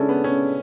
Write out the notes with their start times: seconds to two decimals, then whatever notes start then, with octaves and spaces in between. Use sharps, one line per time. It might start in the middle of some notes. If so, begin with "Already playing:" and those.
Already playing: C#3 G#3 C#4 D4 E4 A4
0.09 B3
0.24 C#4